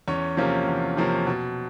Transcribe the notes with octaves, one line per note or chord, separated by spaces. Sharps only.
E2 C#4 C#5
C3 F3 A#3 C#4
E2
C3 F3 A#3 C#4
B2